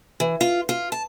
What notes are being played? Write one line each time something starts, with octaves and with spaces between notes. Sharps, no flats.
E3
F4
F4
A5